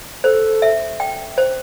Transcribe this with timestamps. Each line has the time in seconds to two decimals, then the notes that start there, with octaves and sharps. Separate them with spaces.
0.24 A4 C5
0.62 E5
1.00 G5
1.38 C5